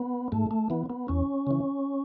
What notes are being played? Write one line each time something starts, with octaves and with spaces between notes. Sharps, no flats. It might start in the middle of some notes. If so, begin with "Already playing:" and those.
Already playing: B3
G#2 A3
A3
E3 B3
B3
E2 C#4
C#3 E3